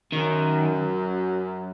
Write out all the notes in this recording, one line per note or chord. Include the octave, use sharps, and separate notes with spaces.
F#2 D#3